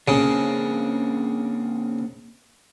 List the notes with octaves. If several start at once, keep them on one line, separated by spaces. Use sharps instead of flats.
C#3 A#3 C4 D4